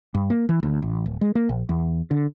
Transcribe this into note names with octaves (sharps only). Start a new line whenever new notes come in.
G2
A#3
E3
D2
A1
D1
G#3
A#3
A#1
E2
D3